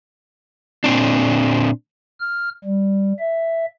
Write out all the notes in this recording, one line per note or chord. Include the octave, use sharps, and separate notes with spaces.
A#2 C4 D4
F6
G3
E5